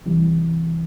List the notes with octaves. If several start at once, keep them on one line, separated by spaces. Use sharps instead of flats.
C2 C3 E3 G3